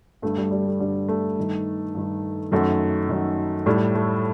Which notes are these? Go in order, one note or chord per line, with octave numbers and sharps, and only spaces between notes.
G2 D3 A3
G3
G3
A3
G2 D3 G3
A3
G2 D#3
G2 D#3
F#2 D#3 A3
F#2 D#3
A2 G3
A3